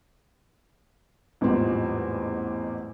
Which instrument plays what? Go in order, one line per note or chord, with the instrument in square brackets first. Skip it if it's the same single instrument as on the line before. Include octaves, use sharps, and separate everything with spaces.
[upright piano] A1 E2 G#2 F3 G3 C4